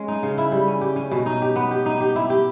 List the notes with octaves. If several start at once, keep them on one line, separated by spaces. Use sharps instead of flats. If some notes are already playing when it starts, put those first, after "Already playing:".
Already playing: G#3 C#4
D#4
C#3
E4
G3
C#4
G4
C#4
B2
D#4
G4
B3
G4
D#4
G4
E4
G4